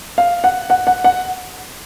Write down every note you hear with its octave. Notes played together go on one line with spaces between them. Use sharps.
F5
F#5
F#5
F#5
F#5